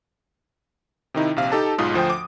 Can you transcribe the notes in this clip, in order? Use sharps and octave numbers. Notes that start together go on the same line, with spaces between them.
C3 D#3 D#4 E4
A#1 C3 F5
D#4 G4 A4 A5
B1 G#2 F4 D#6
D2 F3 C5 G5
D6